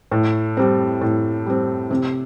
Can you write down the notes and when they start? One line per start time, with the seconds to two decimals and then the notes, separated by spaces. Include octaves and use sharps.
0.11 A2
0.57 G3 C4
1.01 A2
1.46 G3 C4
1.91 C3